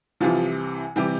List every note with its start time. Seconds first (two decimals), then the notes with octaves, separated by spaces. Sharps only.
0.21 C2 C3 E3 F3 F4
0.96 C3 E3 G3 G4